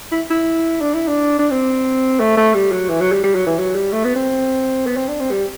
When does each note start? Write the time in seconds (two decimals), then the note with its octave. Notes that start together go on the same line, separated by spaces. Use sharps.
0.12 E4
0.30 E4
0.81 D4
0.94 E4
1.08 D4
1.39 D4
1.51 C4
2.20 A3
2.37 A3
2.54 G3
2.72 F#3
2.89 E3
3.01 F#3
3.12 G3
3.24 G3
3.35 F#3
3.46 E3
3.58 F#3
3.75 G3
3.92 A3
4.05 B3
4.16 C4
4.86 B3
4.97 C4
5.08 D4
5.20 C4
5.31 G3